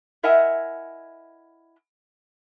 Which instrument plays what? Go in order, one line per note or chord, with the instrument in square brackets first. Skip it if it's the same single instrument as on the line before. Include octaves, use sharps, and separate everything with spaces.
[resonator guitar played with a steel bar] E4 A#4 D#5 E5 F#5 G#5